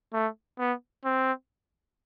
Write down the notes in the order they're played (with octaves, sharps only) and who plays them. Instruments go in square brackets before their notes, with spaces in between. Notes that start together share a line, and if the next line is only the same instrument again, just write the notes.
[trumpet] A3
B3
C4